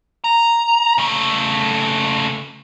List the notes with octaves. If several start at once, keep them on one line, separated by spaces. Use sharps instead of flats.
A#5
C#3 A3